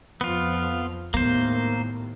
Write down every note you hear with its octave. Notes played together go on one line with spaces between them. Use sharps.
F2 F3 B3 F4
D#2 A2 A#3 B3 C5